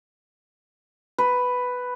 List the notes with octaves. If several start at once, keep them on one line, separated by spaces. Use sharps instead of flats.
B4